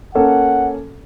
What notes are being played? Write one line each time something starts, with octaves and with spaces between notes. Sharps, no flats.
A#3 C#4 A4 F#5